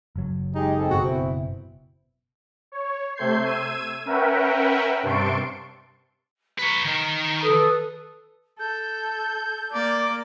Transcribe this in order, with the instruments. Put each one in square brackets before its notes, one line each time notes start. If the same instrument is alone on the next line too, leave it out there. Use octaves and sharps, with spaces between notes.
[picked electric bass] F#1 F#3
[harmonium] G#3 G4 G#4 [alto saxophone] D#4
[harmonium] C4 G#4 A4
[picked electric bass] F#1 B2 [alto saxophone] F#4
[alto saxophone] C4 [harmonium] E4
[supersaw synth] C#5
C3 A3 C5 G6 G#6 C7
E6 G#6 D#7
C#4 A#4 B4 E5 F#5 G5
G2 C3 A5 C6 C#6 D7
[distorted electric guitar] B4 C#5 [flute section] A#5
[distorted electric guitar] D#3
[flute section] A4 B4 D#6
[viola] A4 [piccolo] G6
[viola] A#3 [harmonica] D5